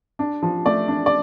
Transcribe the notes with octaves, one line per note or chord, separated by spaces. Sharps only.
D4
F3
A3 D5
D4
D5